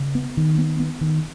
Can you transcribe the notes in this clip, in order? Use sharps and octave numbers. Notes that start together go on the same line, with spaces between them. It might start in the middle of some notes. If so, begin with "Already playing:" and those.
Already playing: C#3
B3
D#3
B3
B3
D#3